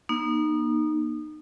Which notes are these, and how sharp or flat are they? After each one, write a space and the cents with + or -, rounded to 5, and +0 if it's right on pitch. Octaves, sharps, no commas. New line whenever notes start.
A#3 +30 D#4 -25